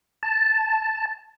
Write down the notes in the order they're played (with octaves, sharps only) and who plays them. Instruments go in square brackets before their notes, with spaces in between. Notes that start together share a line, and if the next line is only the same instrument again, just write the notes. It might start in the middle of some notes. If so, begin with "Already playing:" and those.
[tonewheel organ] A5